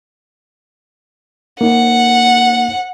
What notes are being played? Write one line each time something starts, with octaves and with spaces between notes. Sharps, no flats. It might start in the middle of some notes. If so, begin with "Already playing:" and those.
A#3 D#4 F#5